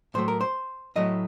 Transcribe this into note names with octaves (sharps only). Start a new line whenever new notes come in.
A2 F#3 A3 C5
A#4
C5
A2 F#3 A3 D#5